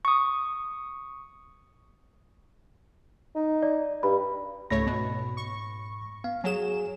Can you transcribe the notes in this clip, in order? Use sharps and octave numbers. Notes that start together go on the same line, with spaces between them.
C#6 D#6
D#4
D5
G2 B5
C#2 G#2 A3 C#5 B5 A#6
B2
C#6
B3 F5
F#3 G#4 C#5 G#5 E7